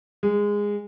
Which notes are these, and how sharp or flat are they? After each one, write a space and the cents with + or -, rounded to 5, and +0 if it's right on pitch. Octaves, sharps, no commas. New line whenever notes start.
G#3 -15